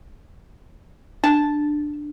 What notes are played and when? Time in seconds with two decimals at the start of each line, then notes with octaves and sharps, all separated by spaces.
1.24 D4 A5